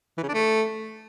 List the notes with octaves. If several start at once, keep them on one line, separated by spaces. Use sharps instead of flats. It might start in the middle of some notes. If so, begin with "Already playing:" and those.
E3
C#3
D4
A3